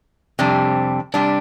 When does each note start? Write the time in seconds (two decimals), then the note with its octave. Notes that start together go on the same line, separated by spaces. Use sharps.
0.39 F2 C3 G3 D4
1.14 C3 G3 D4